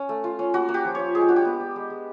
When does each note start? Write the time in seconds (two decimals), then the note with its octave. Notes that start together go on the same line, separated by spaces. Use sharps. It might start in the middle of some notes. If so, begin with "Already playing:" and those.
Already playing: C#4
0.09 A3
0.24 F4
0.39 C#4
0.54 A#3 F#4
0.69 A#3
0.74 G4
0.85 F3
0.95 F4 C#5
1.15 G#3 G#4
1.21 G4
1.29 D4 F#4
1.36 G4
1.45 B3
1.61 D4
1.76 G#3
1.90 G#3